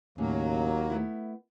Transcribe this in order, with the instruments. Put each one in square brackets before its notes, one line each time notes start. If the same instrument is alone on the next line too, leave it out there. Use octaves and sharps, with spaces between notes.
[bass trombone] D#2 [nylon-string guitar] A2 C#3 [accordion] F#3 A#3
[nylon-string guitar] A3 B3 E4